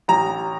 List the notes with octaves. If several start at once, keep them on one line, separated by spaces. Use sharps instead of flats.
A1 A#5